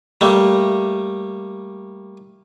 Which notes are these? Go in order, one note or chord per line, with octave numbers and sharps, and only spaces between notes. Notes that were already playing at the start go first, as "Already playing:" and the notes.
G3 A3 A#3